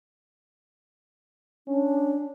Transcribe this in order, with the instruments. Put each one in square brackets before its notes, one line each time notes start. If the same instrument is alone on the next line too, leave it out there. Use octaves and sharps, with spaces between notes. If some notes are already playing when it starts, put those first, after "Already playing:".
[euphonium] C#4 [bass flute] D4